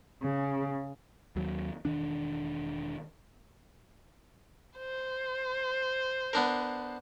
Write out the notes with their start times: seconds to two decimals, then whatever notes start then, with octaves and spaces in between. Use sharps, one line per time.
0.23 C#3
1.36 D#2 F#3
1.85 E1 E2 D#3 D4
4.78 C5
6.33 B3 D4 A#4